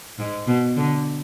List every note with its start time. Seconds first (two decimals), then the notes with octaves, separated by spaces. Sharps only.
0.19 G#2
0.47 B2
0.77 D3